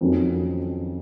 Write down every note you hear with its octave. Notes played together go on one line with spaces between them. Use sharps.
F2 D#3 F#3 C#4